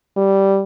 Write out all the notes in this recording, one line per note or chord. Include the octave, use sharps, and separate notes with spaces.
G3